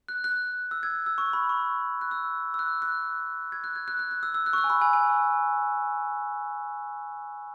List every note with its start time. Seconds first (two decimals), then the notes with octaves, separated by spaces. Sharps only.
0.08 F#6
0.24 F#6
0.71 E6
0.83 G#6
1.06 E6
1.18 C#6
1.33 B5
1.49 C#6
2.01 F#6
2.11 E6
2.54 E6
2.59 F#6
2.82 F#6
3.52 G#6
3.64 F#6
3.76 G#6
3.88 F#6
3.99 F#6
4.11 F#6
4.23 E6
4.34 E6
4.46 F#6
4.53 C#6
4.58 E6
4.64 G#5
4.70 B5
4.81 G#5
4.93 G#5